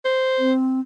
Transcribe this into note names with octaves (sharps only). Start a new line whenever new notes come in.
C5
C4